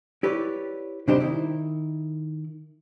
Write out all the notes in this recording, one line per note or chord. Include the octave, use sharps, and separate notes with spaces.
E4 G4 B4 C#5 D5
C3 G3 D4 D#4 G4 C5
D#3 D#4 E4